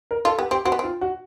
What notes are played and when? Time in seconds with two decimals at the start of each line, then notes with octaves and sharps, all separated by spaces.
0.11 A#4
0.25 F4 A4
0.38 B3 G4
0.51 C4 G4
0.65 C4 F#4
0.72 B3
0.79 C4 F4
1.01 F#4